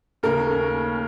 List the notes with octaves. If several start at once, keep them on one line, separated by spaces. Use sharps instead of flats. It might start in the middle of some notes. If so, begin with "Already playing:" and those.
D#2 C#3 A3 A#4